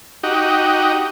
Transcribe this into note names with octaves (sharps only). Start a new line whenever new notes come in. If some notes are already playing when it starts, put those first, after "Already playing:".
D#4 F#4 G4